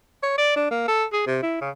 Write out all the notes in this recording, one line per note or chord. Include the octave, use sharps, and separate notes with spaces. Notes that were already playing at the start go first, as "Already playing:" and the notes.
C#5
D5
D4
A#3
A4
G#4
C3
E4
C#3